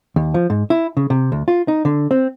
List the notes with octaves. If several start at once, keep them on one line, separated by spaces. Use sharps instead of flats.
D#2
F3
G#2
E4
C#3
C3
D2
F4
D#4
D3
C4